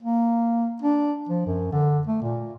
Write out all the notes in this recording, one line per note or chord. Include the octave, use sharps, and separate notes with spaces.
A#3
D4
F3
F#2
D3
A3
A#2